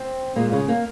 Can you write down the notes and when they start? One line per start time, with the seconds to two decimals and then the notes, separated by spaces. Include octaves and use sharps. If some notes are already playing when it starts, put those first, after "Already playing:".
Already playing: C4
0.36 A#2 G#3 A#3
0.52 C#3 C#4
0.68 A#3